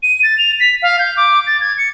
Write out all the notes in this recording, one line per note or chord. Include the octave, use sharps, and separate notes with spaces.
D#7
A6
F7
B6
F5
G6
D6
A6
G#6
C#7